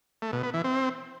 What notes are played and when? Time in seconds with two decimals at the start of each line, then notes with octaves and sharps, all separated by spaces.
0.22 A3
0.33 B2
0.43 B3
0.54 E3
0.64 C4